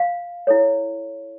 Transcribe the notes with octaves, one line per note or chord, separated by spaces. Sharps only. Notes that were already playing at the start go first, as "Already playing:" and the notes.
Already playing: F5
E4 A4 C#5